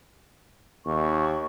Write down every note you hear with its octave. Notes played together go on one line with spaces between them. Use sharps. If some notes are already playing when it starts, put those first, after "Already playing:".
D#2 C#6